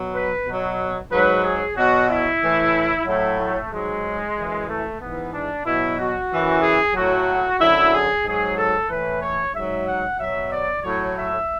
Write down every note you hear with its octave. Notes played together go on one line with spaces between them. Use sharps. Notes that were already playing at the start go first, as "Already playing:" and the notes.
Already playing: B2 F#3
B4
B2 F#3
G#2 F#3 B4
G#4
B2 F#3 F#4
E4
A2 E3
A2 F#3 E4
A3
G#2 F#3 G#3
F#2 E3
A3
G#2 E3 B3
D4
B2 F#3 E4
F#4
F#2 E3
G#4
A2 F#3 F#4
F#2 D3 F#3 E4
G#4
G#2 F#3 G#4
A4
A2 E3 B4
C#5
G#2 F#3 E5
F#5
B2 F#3 E5
D5
A2 F#3 C#5
E5